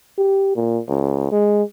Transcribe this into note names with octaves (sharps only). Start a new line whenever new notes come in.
G4
A#2
C#2
G#3